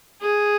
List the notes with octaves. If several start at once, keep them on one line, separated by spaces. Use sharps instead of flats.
G#4